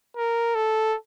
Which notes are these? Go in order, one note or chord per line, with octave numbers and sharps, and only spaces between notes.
A#4
A4